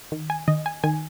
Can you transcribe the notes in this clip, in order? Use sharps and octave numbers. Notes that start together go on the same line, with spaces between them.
D#3
G#5
D#3 D#5
G#5
D#3 G#5